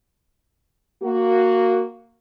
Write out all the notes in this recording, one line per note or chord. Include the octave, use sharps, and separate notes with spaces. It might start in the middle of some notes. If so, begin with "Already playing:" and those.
A#3 F#4